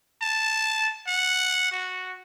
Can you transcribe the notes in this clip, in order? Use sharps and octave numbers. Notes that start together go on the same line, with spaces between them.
A5
F#5
F#4